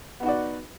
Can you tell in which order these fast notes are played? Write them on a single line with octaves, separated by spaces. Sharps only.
B3 D#4 F#4 D5